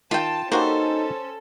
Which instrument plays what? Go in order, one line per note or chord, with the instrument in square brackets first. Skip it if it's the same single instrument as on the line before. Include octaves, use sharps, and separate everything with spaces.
[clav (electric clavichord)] D#3 [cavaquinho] F4 G5 [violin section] A5
[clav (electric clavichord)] A#3 F#4 G4 [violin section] C#4 A4 [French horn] D#4 [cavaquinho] C5